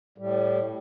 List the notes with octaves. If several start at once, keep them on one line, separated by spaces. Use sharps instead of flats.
A2 G3